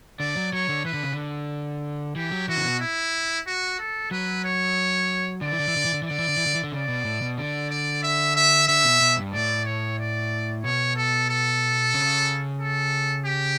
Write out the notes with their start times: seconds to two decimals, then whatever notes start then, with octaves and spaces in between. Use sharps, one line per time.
0.19 D3 D5
0.37 F#3
0.53 F#3 C#5
0.69 D3
0.85 E3 B4
0.94 D3
1.04 C#3
1.12 D3
2.16 E3 G4
2.32 F#3
2.48 E3 F#4
2.57 C#3
2.64 B2
2.80 E4
3.47 F#4
3.79 A4
4.11 F#3 B4
4.45 C#5
5.41 D3 D5
5.51 E3
5.59 D3
5.68 E3
5.77 D3
5.85 E3
5.94 D3
6.03 E3
6.07 D3 D5
6.19 E3
6.29 D3
6.37 E3
6.46 D3
6.55 E3
6.64 D3
6.72 C#3 D5
6.88 B2
7.05 A2
7.22 B2
7.38 D3 D5
7.70 D5
8.03 E5
8.36 E5
8.68 D3 E5
8.84 B2
9.01 B2
9.17 G2
9.34 A2 D5
9.66 C#5
9.99 D5
10.63 B2 C#5
10.96 A4
11.30 A4
11.94 C#3
12.60 A4
13.25 G4